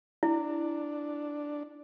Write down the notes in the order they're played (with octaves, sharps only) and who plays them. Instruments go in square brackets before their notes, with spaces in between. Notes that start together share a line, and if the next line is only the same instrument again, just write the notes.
[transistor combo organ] D4 [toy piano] E4